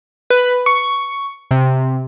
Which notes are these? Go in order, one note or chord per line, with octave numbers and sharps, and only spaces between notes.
B4
C#6
C3